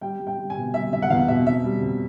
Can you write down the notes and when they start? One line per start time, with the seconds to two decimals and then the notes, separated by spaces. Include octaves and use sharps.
0.01 G3 G5
0.20 G3
0.27 G5
0.38 G3
0.50 G#5
0.57 B2
0.74 G3 E5
0.92 G3 E5
1.02 F#5
1.10 E2 F5
1.28 B2 E5
1.46 F2 E5
1.64 G3
1.82 F2